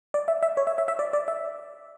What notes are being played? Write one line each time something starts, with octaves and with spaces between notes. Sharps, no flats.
D5
E5
E5
C#5
E5
E5
E5
D5
D5
E5